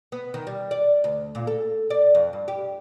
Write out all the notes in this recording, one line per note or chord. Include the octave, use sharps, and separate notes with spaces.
B3
D#3
G3
D5
D2
A#2
A4
D5
F2
G2
G4